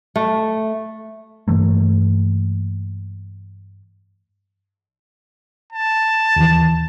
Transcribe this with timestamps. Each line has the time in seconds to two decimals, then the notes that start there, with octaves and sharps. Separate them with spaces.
0.16 A3
1.48 G2 E3 A3 A#3
5.73 A5
6.36 D#2 E3